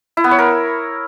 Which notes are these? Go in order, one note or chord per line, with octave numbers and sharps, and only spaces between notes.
E4
B3
C#5
A#4